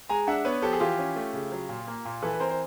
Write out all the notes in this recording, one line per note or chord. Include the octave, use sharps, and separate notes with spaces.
G#3 G#5 A#5
D4 E5 F#5
B3 B4 C#5
F3 G4 A4
G#4
E3 F4 G4
C#4
A3
C#3
F#3
A#2
A#3
A#2
E3 A4 B4
B4
C4 A#4 C5
C5